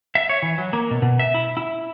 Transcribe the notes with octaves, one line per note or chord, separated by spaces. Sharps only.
E5
C#5
E3
F#3
A#3
B2
B2
E5
E4
E4